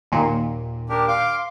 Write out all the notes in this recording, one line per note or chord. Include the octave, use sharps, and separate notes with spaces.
D#2 A#2
D4 G4 A#4
F5 C6 D6